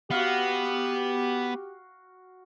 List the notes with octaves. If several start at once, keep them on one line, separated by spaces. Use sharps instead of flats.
B3 F#4 G4 F5